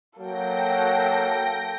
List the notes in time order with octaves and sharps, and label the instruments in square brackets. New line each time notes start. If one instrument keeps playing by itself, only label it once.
[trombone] F#3 [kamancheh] A#3 A4 [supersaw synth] G5 A#6